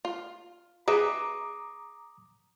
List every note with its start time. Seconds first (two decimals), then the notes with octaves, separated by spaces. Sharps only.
0.05 F4
0.88 G#4 B4 E5 A#5 D6 D#6